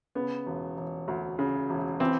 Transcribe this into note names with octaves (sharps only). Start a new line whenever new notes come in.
C#3 B3
E1
E1
D2
C#3
E1
E3 C4